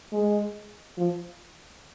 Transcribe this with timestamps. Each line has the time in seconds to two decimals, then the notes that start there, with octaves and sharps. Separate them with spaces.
0.12 G#3
0.97 F3